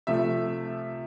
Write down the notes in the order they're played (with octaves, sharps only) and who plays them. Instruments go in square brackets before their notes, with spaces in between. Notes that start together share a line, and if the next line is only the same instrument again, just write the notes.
[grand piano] C3 F3 A3 E5